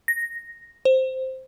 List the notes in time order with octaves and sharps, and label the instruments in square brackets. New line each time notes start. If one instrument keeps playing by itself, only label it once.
[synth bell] A#6
C5